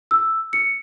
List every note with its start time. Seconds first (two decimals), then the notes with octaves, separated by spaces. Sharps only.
0.11 E6
0.53 C#7